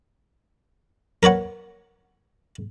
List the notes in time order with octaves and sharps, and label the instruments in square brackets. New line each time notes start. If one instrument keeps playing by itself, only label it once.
[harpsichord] A#4 B4 C#5 F#5